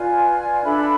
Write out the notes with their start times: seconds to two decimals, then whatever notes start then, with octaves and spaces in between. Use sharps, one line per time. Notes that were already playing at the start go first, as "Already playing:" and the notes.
Already playing: F4 B4 D5 G#5
0.63 D4 A4 E5 B5